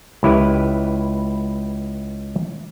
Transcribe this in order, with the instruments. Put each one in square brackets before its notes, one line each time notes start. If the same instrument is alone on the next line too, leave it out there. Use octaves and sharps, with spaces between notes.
[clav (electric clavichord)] C#2 E4 G4 B4